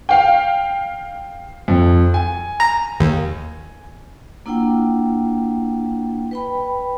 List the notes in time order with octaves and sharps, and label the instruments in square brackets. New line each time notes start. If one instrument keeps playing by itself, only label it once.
[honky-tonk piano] F5 G5
[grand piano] F2
G#5
[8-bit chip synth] A#5
D#2
[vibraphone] A#3 D4 E4 F4 F#5 G5
B4 G5 B5